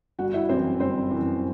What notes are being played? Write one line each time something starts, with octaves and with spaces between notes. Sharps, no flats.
G1 F#4 F#5
E4 E5
F#2 E3 C4 C5
G1 C4 C5
F#2 E3